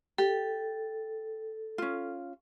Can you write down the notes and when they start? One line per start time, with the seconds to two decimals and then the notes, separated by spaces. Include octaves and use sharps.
0.18 G4 A4
1.78 C#4 F4